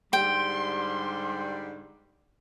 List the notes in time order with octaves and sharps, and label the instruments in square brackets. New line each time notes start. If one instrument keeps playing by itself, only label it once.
[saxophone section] G#2 D3 G3 [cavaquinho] G5 [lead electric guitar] C6